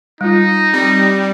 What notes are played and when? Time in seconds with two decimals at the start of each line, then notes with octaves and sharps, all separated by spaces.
0.21 G3 D#4 F4
0.74 G3 C4